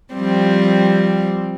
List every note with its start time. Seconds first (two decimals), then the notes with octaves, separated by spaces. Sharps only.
0.13 F3 G3 C4